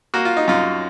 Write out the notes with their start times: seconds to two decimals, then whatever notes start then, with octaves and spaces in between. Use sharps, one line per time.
0.14 A#3 F#4
0.25 F4
0.37 D#4
0.48 F#2 F4